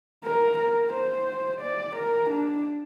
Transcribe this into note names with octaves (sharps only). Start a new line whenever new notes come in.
A#4
A#4
C5
D5
A#4
D4